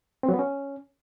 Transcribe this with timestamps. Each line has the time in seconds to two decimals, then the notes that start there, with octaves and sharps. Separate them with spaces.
0.23 C4
0.29 F#3
0.34 B3
0.39 C#4